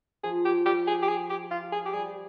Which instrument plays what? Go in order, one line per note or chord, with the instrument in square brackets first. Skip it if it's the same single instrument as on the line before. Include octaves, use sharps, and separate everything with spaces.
[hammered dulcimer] F3 [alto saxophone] G#4
[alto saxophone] G4
G4
G#4
G4
G#4
G4
F4
G#4
G4
[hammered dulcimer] G3 [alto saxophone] G#4